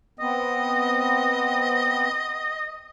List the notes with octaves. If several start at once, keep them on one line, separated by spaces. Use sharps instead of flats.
B3 C4 D#5